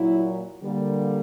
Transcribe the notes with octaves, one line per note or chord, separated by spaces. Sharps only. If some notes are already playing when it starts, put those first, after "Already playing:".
Already playing: A#2 F#3 A#3 E4
D3 G3 A#3